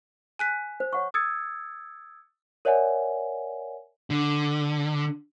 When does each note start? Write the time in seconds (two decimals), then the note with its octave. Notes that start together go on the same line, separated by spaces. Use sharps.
0.39 G#5 F#6 B6
0.80 C5
0.93 C#5 F#5 C#6
1.14 D#6 E6 G#6 A6 C#7
2.65 A#4 C#5 D5 E5 F#5 G#5
4.10 D3